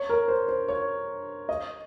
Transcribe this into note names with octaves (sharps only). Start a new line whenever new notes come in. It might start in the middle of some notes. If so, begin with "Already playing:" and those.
Already playing: C#5
A#4
C5
C5
C#5
D#5